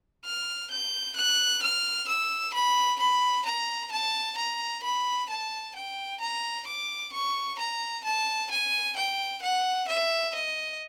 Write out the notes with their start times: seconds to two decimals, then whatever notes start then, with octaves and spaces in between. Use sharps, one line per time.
0.25 F6
0.71 G6
1.16 F#6
1.62 F6
2.08 E6
2.54 B5
3.00 B5
3.46 A#5
3.92 A5
4.38 A#5
4.83 B5
5.30 A5
5.76 G5
6.21 A#5
6.67 D6
7.13 C#6
7.59 A#5
8.04 A5
8.51 G#5
8.97 G5
9.42 F#5
9.88 E5
10.34 D#5